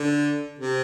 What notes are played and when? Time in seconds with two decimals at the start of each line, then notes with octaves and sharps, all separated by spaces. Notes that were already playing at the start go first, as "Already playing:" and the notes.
Already playing: D3
0.59 C3